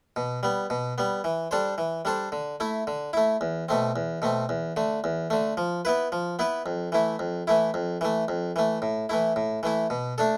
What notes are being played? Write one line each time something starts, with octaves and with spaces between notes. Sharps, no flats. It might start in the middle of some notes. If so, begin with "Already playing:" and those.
B2
G3 B3
B2
G3 B3
E3
G3 D4 A4 C5
E3
G3 D4 A4 C5
D3
A3 E4
D3
A3 E4
E2
B2 A3 C4
E2
B2 A3 C4
E2
D3 A3
E2
D3 A3
F3
B3 E4 B4
F3
B3 E4 B4
F2
E3 A3 E4
F2
E3 A3 E4
F2
E3 A3
F2
E3 A3
A2
E3 A3 E4
A2
E3 A3 E4
B2
A3 D4 A4